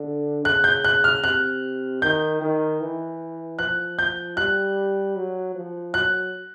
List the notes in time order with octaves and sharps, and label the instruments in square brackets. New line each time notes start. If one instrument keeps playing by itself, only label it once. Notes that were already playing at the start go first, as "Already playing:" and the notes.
Already playing: [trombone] D3
[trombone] C#3 [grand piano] F#6
[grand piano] G6
F#6
F6
[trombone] C3 [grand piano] F#6
[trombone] D#3 [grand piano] G6
[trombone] D#3
E3
[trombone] F3 [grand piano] F#6
[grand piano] G6
[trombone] G3 [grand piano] F#6
[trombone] F#3
F3
[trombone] F#3 [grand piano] F#6